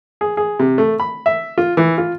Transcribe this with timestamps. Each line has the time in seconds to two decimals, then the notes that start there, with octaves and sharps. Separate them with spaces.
0.21 G#4
0.37 G#4
0.59 C3
0.78 A3
1.00 B5
1.26 E5
1.58 F4
1.77 E3
1.98 F4